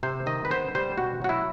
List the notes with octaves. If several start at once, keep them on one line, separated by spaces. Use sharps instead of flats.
C3 C5
D#3 D#5
B4
B3 C5
G3 C5
B2 F#4
F#3 F#4
E4